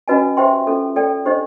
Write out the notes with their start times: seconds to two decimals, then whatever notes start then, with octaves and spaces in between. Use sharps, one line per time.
0.08 C#4 F#4 B4 D#5 G#5
0.37 G4 C5 E5 G5 C6
0.67 C#4 F4 A4
0.96 A4 D5 G5
1.25 D4 G4 C5 D#5